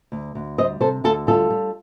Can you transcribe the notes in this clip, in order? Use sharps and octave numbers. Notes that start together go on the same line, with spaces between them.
D2
D2
G3 C5 D#5
C3 A4 C5
D2 F4 A4
G3 F4 A4
G3